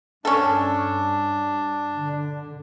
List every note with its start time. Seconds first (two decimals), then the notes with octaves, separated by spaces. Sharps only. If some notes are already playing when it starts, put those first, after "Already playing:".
0.25 G2 C#4 D4 A4
1.95 D3